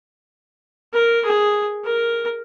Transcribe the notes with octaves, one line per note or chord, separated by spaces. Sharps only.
A#4
G#4
A#4